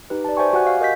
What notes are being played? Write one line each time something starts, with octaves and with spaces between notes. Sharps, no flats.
D#4 G4 B4
D5 A5
C5 D5 E5 G5 G#5 C#6
F#4 G4 F#5 G#5 F#6
F5
A#4 D#5 G6 B6